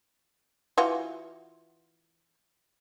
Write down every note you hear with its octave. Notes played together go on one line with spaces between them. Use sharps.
E3 F4 F#4